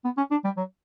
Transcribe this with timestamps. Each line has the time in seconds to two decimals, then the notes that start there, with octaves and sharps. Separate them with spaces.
0.04 B3
0.17 C#4
0.31 D4
0.44 G3
0.57 F#3